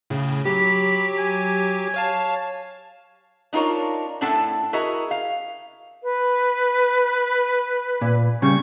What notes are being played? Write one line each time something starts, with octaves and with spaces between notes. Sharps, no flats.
A2 C#3
F#3 G4 B5
G#5
C#5 F5 A5
D4 D#4 F4 A#4 C#5
A2 D4 E4 A4 F#5 A5
E4 F#4 G#4 A#4 D#5
F5
B4
A#2
C#3 G3 C#6